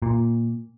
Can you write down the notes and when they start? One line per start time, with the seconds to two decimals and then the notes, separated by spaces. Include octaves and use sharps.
0.02 A#2